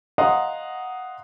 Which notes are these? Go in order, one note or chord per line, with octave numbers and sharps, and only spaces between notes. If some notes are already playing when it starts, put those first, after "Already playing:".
D#5 F5 F#5 A#5 C6 D#6